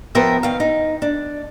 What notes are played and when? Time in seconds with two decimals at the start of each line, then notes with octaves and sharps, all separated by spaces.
0.15 F2 F3 B3 A#4 E5 G5
0.43 D#3 F5
0.60 D#4
1.02 D4